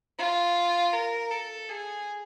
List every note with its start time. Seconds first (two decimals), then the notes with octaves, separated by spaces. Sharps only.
0.18 F4
0.93 A#4
1.31 A4
1.69 G#4